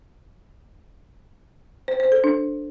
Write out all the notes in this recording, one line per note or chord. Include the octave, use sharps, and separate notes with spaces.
C5
C5
A4
D4